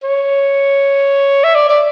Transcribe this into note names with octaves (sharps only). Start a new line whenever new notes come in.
C#5
E5
D5
D5